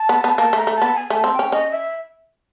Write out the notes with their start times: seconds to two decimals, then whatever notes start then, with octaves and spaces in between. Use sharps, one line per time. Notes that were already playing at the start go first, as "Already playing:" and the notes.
Already playing: A5
0.09 B3
0.24 B3
0.38 A#3 A5
0.53 A3 A#5
0.67 A3
0.76 A5
0.82 B3
0.96 G#5
1.10 A3 A5
1.24 C4
1.34 G5
1.39 C#4
1.52 C#4 D#5
1.71 E5